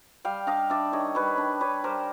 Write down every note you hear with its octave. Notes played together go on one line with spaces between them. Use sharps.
G3 F5 G5
D4 D#5 F5
D4 D5 E5
D#3 C#5 D#5
G3 B4 C#5
D4
D4 B4 C#5
G3 A#4 C5